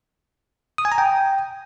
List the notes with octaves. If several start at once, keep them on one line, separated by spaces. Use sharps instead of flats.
D#6
G#5
A#5
G5